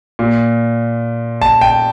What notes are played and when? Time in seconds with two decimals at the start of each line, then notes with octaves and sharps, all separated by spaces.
0.19 A#2
1.42 A5
1.61 G5